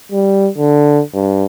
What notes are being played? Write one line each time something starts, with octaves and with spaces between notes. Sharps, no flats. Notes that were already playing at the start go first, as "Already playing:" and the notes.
G3
D3
G2